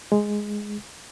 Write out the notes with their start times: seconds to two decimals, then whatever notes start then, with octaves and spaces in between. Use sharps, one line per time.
0.12 G#3